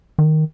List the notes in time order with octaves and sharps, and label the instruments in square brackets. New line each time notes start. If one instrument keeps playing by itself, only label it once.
[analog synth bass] D#3